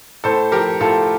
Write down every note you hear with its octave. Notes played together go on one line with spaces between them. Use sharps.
A2 A4 C5
F3 G4 A#4
A2 F4 A4